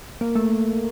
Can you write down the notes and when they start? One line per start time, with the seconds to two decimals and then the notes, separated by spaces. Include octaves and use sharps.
0.21 A#3
0.35 A3